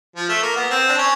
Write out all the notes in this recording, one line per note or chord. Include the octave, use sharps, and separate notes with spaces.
F3
A3
A#3
B3
C4
D4
C#4